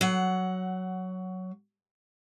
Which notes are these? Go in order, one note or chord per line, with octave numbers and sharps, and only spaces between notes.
F#3 F#5